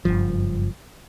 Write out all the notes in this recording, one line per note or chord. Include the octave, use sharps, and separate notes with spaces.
F#1 G2 F3